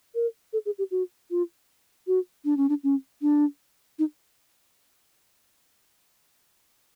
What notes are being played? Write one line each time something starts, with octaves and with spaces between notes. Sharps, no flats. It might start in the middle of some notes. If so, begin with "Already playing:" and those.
A#4
A4
G#4
G4
F#4
F4
F#4
D4
C#4
D4
C#4
D4
D#4